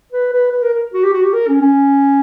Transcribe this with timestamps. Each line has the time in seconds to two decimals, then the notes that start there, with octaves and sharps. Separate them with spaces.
0.12 B4
0.33 B4
0.52 B4
0.62 A#4
0.73 A#4
0.93 F#4
1.04 G4
1.14 F#4
1.23 G4
1.33 A#4
1.48 C#4
1.61 C#4